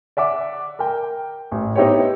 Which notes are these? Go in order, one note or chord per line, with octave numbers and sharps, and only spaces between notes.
D5 E5 F#5 D6
A#4 G5
A1
B3 D#4 E4 G4 C5 C#5